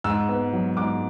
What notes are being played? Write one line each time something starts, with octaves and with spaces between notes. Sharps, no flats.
G#2 E6
B3
F#3
G#2 D6